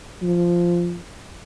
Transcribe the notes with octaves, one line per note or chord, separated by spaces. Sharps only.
F3